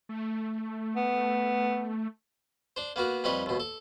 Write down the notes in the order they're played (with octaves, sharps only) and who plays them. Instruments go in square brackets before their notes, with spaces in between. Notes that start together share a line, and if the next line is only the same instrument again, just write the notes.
[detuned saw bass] A3
[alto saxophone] B3
[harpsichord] D4 C5
A#3 B3 F#4 A#4
F2 G3 D#4 B4 C#5
D#2 B2
A4